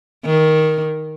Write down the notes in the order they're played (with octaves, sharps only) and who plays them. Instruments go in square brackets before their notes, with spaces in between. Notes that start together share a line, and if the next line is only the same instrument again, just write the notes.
[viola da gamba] D#3